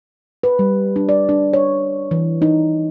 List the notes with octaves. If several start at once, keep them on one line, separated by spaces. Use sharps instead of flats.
B4
G3
D4
D5
D4
C#5
E3
D#4